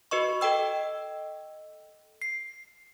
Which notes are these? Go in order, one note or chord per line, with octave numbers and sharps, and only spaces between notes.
F#4 B4 D#5 C#6
A4 D#5 G5 E6
C7